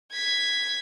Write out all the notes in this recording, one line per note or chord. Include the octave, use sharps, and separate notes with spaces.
G#6 B6